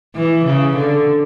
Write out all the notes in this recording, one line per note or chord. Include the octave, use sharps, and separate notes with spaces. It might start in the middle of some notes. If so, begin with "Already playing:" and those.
E3
C#3
D3